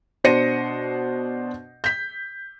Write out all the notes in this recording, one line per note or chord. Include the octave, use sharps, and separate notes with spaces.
B2 D4 C5 A#6 C#7 D#7
G6 B6